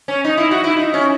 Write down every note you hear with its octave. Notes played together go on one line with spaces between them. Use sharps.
C#4
D#4
E4
F#4
E4
D#4
C#4